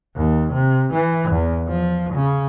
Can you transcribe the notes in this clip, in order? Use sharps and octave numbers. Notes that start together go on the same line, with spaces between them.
D#2
C3
E3
E2
F3
C#3